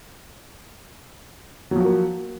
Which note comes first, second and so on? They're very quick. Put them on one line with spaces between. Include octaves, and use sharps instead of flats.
F#3 F3 F#4 A#3